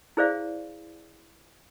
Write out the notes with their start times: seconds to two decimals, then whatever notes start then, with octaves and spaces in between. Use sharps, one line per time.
0.17 E4 G#4 C5 D5 F5